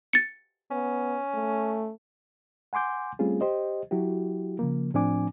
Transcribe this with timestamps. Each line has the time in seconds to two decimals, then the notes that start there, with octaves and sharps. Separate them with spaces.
0.13 A6 C#7
0.71 B3 C#4
1.34 A3
2.73 F#5 G#5 C6 D6 G6
3.19 G3 A3 C4 C#4 F4 G#4
3.41 G4 C5 D#5
3.91 F#3 E4 F#4 G4
4.59 C#3 F3 A#3
4.94 A2 F3 C4 D4 G#5 D6